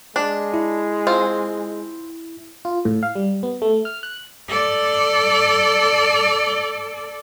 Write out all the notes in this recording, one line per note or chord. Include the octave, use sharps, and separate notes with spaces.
G#3 D4
E4
C4 F4
F4
A2
F5
G3
B3
A3
F6
F#6
A4 D5